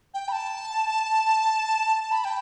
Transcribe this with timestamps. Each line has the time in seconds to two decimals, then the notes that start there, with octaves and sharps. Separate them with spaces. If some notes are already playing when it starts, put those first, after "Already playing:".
0.14 G5
0.28 B5
0.32 A5
2.03 A5
2.12 B5
2.24 G5